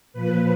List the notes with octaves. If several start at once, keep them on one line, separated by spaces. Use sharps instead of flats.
A#2 F3 B4